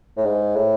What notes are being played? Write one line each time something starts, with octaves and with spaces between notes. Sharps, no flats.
A2
G#2
A2